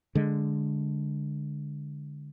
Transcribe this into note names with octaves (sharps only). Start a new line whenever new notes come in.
D3 G#3